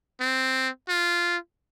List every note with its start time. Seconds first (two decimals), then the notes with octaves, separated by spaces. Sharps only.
0.21 C4
0.89 F4